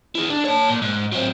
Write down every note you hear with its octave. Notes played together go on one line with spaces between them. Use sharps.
E4 G#4
D4
C#5 A5
A#2
G#2
F#3 C4